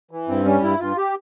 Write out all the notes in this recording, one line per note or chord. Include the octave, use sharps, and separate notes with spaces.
E3
G2 C4
G3 C#4
G2 E4
G2 F4
G4